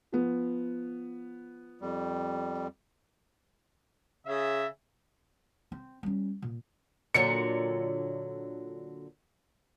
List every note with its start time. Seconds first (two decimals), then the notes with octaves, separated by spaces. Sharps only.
0.12 F3 B3
1.81 F2 G3
4.27 C#3 G#4 E5
5.72 C4
6.03 G3 C#4
6.42 A#2
7.14 A#2 D3 F#3 C#7